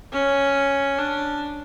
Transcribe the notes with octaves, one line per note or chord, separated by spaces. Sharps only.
C#4
D4